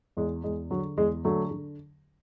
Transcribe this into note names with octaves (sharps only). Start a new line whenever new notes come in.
E2 G#3
E2 G#3
D3 F#3
E2 G#3
D3 F#3 A3
D3